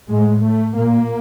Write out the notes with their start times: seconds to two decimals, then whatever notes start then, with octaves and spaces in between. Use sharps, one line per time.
0.10 A2 G#3
0.43 A3
0.76 A#2 A#3